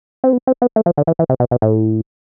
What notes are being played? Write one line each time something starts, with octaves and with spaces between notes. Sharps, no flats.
C4
B3
C4
B3
A3
F3
D3
E3
E3
C3
B2
B2
A2